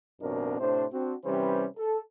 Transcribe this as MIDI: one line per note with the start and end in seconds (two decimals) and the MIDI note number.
0.21 0.58 33
0.21 0.58 42
0.21 0.58 47
0.21 0.58 60
0.21 0.58 62
0.21 0.58 70
0.60 0.85 45
0.60 0.85 48
0.60 0.85 62
0.60 0.85 72
0.93 1.13 60
0.93 1.13 62
0.93 1.13 66
1.25 1.66 48
1.25 1.66 52
1.25 1.66 55
1.25 1.66 61
1.25 1.66 71
1.25 1.66 72
1.77 1.98 69